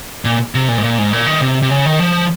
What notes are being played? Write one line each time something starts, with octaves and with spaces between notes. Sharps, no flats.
A#2
C3
A#2
G#2
A#2
G#2
A#2
D#3
C3
C3
C#3
D#3
F3